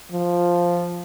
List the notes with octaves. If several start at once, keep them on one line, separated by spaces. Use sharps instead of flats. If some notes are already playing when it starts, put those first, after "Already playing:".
F3